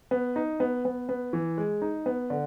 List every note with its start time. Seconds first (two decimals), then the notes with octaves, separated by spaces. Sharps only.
0.11 B3
0.36 D#4
0.60 B3
0.85 B3
1.09 B3
1.33 E3
1.58 G#3
1.82 D#4
2.06 B3
2.30 D3